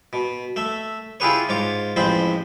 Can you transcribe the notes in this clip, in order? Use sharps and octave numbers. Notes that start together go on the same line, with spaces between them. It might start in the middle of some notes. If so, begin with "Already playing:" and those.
B2
A3 E5
E4 F4 G4 G#4 B4 C#5
G#2 F4 C#5 D6
A1 F2 G#3 C4 C5 B5